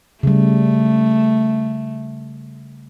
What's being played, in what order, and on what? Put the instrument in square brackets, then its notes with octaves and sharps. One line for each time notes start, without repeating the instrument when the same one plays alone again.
[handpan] C#3 G3 [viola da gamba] A3